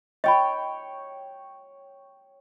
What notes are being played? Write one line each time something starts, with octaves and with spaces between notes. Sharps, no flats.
C#5 D#5 G5 B5